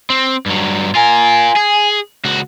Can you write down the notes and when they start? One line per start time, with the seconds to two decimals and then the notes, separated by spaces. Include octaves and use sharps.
0.10 C4
0.46 G2 F#3
0.95 F4 A#4 G#5
1.56 G#4
2.25 C#2 F#4